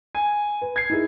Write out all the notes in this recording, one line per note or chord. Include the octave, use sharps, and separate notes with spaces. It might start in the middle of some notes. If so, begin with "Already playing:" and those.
G#5
B4
G#6 C7
D#4 E4 G#4